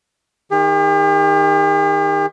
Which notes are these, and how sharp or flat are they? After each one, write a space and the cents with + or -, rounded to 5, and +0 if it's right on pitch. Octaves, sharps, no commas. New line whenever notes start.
D#3 +0 G4 +45